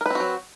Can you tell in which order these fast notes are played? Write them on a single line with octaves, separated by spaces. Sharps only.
A#4 B4 C4 F#4 F#3